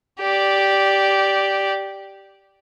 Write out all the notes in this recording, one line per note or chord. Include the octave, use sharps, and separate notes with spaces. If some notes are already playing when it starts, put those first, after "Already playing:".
G4 D5